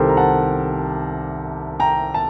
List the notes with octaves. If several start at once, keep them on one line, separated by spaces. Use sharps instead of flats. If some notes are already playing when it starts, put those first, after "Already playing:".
Already playing: C2 C3 D#3 G4 A4 A#4 C5
A#5
F#5 A5
G5 A#5
A5